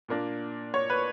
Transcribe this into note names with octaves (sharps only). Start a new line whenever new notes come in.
A#2 A#3 D4
C#5
B4